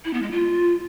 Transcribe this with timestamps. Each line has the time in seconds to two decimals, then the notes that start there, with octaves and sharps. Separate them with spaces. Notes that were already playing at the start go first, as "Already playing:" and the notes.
0.05 E4
0.14 B3
0.22 G#3
0.31 F4